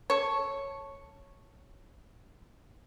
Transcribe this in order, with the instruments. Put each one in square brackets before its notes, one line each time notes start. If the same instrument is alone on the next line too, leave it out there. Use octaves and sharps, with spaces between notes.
[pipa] A4 C#5